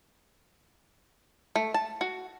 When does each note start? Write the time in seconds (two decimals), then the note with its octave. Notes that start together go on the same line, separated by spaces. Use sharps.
1.56 A3
1.74 A5
2.01 F#4